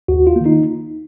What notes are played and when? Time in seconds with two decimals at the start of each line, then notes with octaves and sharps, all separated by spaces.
0.08 D#2 F#4
0.27 F4
0.36 D#3 A#3
0.46 D#4